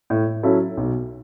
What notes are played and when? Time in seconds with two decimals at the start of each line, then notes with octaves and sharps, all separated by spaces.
0.10 A2
0.43 F#3 C#4 E4 A4
0.77 B1